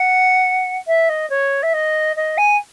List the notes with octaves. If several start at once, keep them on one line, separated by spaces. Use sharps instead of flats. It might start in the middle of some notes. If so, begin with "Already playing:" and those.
Already playing: F#5
E5
D#5
C#5
E5
D#5
D#5
G#5